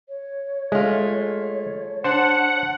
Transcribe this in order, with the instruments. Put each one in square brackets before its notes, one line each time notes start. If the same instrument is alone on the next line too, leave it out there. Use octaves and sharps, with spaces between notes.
[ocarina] C#5
[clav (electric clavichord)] G#3 [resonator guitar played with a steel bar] A3 F4
[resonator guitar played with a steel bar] D4 A5 [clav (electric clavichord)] C5 [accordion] F#5